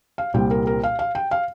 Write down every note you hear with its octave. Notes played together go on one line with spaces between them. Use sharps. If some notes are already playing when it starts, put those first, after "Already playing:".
F5
C2 A#2 G3 C4 G5
A#4
A#4
F5
F5
G5
F5